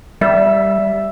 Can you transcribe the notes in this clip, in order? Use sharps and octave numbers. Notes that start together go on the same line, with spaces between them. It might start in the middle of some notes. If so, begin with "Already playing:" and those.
G3 E5